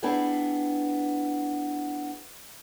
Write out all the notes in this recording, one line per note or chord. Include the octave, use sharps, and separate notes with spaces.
B3 D4 E4 G#4 G5